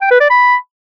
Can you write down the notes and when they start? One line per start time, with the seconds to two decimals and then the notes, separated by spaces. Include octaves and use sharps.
0.01 G5
0.11 B4
0.21 D5
0.30 B5